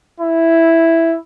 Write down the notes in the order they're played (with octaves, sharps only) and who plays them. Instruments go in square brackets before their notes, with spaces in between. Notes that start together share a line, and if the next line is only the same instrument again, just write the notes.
[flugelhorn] E4